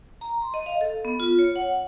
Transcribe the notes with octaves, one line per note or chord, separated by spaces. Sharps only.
A#5
C6
D#5
F5
A4
B3
F4
C#5
F#5